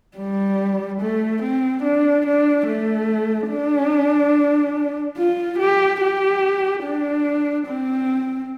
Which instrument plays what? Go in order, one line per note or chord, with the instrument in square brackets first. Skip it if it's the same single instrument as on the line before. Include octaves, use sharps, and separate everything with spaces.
[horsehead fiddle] G3
A3
C4
D4
D4
A3
D4
F4
G4
G4
D4
C4